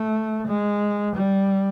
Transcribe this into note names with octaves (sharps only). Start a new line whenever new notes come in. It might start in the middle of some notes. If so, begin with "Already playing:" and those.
Already playing: A3
G#3
G3